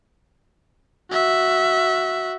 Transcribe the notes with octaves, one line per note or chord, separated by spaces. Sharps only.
F#4 E5